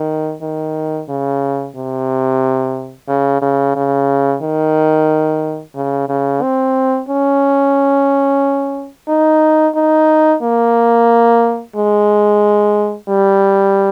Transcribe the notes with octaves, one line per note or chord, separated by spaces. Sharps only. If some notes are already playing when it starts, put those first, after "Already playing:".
Already playing: D#3
D#3
C#3
C3
C#3
C#3
C#3
D#3
C#3
C#3
C4
C#4
D#4
D#4
A#3
G#3
G3